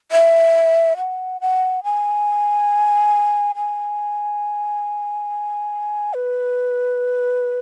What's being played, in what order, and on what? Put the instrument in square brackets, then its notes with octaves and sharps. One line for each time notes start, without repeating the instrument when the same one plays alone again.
[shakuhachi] E5
F#5
F#5
G#5
G#5
B4